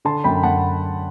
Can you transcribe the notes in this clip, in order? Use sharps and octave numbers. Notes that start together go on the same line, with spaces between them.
D3 A5 C6
F#2 G5 B5
F#2 F#5 A5